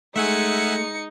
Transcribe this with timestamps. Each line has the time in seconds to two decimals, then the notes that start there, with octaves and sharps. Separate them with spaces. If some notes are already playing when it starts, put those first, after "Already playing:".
0.16 G#3 A3 D#4 E5 F#5 G#5 C#7